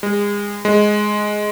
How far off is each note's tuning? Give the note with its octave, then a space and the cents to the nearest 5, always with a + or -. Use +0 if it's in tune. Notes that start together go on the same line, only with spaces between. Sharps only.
G#3 -30
G#3 +5